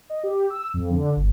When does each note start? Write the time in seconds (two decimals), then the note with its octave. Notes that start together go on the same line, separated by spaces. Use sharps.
0.10 D#5
0.23 G4
0.50 E6
0.74 F2
0.91 D3
1.16 G1